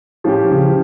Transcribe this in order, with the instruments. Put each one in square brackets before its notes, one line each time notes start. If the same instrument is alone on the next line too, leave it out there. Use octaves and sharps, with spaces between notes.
[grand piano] A2 [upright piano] F3 C#4 G4
[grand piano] C#3
E3